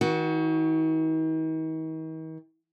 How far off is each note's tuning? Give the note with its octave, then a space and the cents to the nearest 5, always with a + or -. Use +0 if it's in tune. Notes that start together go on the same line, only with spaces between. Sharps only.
D#3 +45 F#4 +0